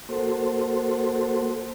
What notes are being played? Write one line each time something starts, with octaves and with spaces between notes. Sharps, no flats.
A#3 F#4 A4 C5